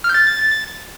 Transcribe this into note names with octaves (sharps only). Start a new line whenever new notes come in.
F6
G6
A6